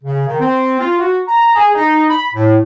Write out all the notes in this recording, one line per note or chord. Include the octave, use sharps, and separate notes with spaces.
C#3
D#3
C4
F4
F#4
A#5
G#4
D#4
B5
A2